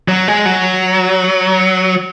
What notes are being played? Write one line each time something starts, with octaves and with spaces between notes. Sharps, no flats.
F#3
G#3
F#3